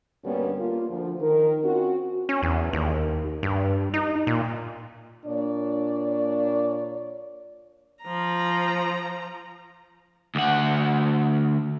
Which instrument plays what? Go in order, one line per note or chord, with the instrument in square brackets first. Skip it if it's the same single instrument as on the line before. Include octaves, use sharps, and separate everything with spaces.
[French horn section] D2 G2 G3 A#3 B3 C#4
A#3 F4
D2 F3
D#3 A#4
C4 C#4 F4 F#4
[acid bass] C#4
E2
D#2
G2
D#4
A#2
[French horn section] A#2 D4 C#5 D5
[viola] F3 A#5
[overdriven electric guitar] D2 F#5